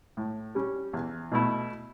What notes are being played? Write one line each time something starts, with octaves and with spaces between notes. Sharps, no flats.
A2
G3 C#4
E2
B2 A3 E4